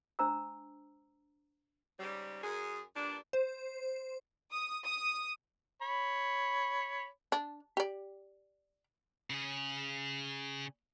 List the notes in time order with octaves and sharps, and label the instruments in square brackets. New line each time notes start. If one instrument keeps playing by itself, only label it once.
[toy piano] D4 C5 A#5 E6
[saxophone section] G#2 C#3 G3
F#2 G#4
G2 A#2 D4
[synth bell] C5
[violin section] D#6
D#6
[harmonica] C#5 B5
[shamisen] D4
G4 D5
[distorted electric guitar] C#3 G#4